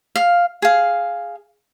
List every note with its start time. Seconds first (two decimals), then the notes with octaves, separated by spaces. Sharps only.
0.16 F5
0.62 G#4 F5